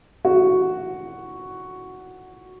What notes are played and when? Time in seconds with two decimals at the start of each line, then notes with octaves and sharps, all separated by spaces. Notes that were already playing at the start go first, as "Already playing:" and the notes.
0.25 F#4